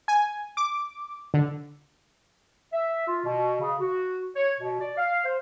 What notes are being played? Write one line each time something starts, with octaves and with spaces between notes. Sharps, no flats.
G#5
D6
D3
E5
F4
B2
C#3
F#4
C#5
B2
D5
F5
C5